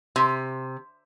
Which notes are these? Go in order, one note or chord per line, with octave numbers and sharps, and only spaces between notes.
C3